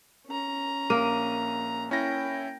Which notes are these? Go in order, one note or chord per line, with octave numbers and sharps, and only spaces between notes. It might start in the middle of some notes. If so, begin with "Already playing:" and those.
C#4 A#5
A#1 A#3 D#7
C#4 E4 G5 A#6